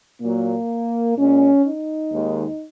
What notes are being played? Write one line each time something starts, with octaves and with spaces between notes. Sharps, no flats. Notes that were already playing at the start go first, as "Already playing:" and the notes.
A#2 F#3 A#3
A#2 G#3 C#4
D#4
D#2 D#3 G#3